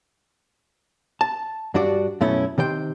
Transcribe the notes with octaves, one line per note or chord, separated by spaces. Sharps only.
A5
G2 D4 F#4 D5
F#2 B2 A3 C#4 E4
C3 D#3 C5 G5